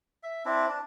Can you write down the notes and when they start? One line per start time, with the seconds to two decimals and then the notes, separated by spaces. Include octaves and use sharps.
0.23 E5
0.45 C4 D4 E4
0.68 D4